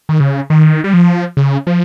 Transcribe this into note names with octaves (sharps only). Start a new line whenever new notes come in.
D#3
C#3
D#3
G3
F3
C#3
F3